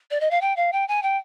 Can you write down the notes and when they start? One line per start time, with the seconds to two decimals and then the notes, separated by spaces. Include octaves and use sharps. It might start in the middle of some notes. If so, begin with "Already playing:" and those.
0.11 D5
0.20 D#5
0.31 F5
0.41 G5
0.57 F5
0.73 G5
0.88 G#5
1.03 G5